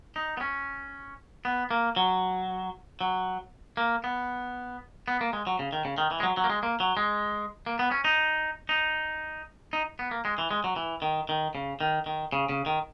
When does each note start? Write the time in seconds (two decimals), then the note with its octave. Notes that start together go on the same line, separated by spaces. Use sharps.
0.16 D#4
0.37 B3
0.41 C#4
1.45 B3
1.71 A#3
1.96 F#3
3.01 F#3
3.77 A#3
4.04 B3
5.08 B3
5.21 A#3
5.33 G#3
5.47 F#3
5.59 C#3
5.73 D#3
5.85 C#3
5.98 D#3
6.11 E3
6.20 G#3
6.23 F#3
6.37 F#3
6.44 A#3
6.50 G#3
6.63 A#3
6.80 F#3
6.97 G#3
7.66 A#3
7.79 B3
7.91 C#4
8.05 D#4
8.69 D#4
9.73 D#4
9.99 B3
10.11 A#3
10.25 G#3
10.38 E3
10.51 G#3
10.64 F#3
10.76 E3
11.02 D#3
11.29 D#3
11.55 C#3
11.81 D#3
12.06 D#3
12.32 C#3
12.49 C#3
12.66 D#3